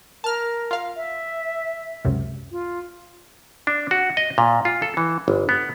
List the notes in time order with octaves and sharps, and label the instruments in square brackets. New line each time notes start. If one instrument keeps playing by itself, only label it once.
[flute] A#4 [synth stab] A5 F6
[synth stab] F4 F5
[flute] E5
[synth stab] C#2 F#2 C3
[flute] F4
[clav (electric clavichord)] D4
F#4
D#5
A#2
F4
A4
E3
G1
B3